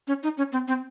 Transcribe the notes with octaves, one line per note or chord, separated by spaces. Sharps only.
C#4
D#4
C#4
C4
C4